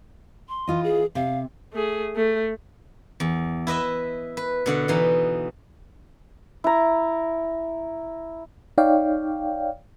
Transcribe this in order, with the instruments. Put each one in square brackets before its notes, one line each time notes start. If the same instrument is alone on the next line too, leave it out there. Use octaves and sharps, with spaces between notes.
[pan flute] C6
[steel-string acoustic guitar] E3 F4 D#5
[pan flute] G#4
[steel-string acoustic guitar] C3 [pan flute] F5
[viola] A3 G#4
A3
[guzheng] E2
E4 B4 D#5 E5
B4
B2 D3 F#5
B2 E3 D#4
[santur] E4 A#5
[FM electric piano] D#4 C#5 D5 F5 G5